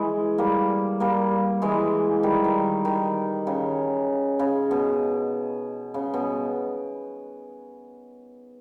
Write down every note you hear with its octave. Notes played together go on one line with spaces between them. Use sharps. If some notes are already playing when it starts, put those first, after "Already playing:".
Already playing: E3 G#3
G3 A#3
G3 A#3
E3 G#3
D#3 G3
D#3
D#3
C#3
C#3
B2
C#3
B2